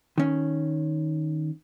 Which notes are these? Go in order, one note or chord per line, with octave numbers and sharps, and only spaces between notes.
D#3 C#4